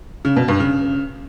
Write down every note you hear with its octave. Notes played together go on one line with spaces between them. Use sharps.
C#3
B2
G2
C#3